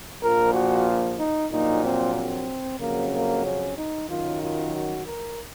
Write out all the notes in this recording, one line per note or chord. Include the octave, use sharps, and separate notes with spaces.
A#1 A#2 F3 A#4
F#4
D#4
A#1 A#2 F#3 D#4
C4
C4
F2 C#3 F#3 A#3
A#3
C#4
D#4
F#2 D#3 F#3 F4
F4
F#4
A#4